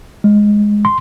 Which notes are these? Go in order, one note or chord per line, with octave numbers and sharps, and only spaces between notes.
G#3
C6